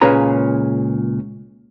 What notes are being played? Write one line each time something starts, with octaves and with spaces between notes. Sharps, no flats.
C#2 A#2 C#4 G#4 B4 A#5